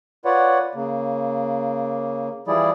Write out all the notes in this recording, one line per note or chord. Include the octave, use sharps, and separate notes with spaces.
F4 B4 C#5 D5 F#5
C#3 A#3
E3 F3 G3 E4 G#4 D5